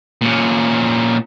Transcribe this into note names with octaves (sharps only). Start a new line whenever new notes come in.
A#2 C#4